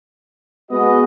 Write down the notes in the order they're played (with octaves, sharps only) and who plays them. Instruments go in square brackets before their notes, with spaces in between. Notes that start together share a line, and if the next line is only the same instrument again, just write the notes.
[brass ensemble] G#3 F#4 D#5 [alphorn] B3